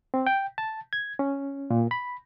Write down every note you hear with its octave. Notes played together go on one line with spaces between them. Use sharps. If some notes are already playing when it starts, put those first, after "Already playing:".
C4
G5
A5
G#6
C#4
A#2
B5